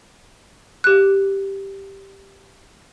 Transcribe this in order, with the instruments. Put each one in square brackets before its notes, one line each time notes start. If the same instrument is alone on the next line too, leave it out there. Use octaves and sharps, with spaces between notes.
[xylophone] G4 F#6